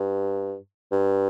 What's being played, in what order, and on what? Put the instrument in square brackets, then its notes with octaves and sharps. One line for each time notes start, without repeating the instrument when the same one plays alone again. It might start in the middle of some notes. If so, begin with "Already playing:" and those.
Already playing: [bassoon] G2
G2